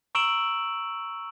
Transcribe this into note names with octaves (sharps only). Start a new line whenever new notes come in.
A#5 C#6 E6 D7 E7 F#7